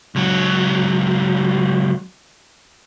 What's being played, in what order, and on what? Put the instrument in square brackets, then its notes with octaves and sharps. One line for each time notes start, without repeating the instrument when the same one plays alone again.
[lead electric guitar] C#2 F#3